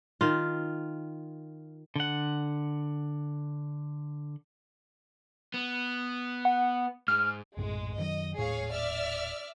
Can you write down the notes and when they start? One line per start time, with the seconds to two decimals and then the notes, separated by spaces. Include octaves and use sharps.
0.21 D#3 F4
1.96 D3 F#5
5.54 B3
6.45 F#5
7.08 G#2 F6
7.57 A#1 F#2 A2 G#3
7.98 F#2 D#3 F#3 D#5
8.38 D#1 A2 G#4 C#5 F5
8.73 D5 E5 F6